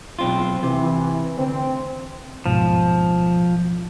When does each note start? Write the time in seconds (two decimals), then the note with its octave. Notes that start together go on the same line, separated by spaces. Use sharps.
0.19 B1 C4 F4
0.63 C3 E3
1.38 D2 C4
2.46 D1 G#2 B2 F3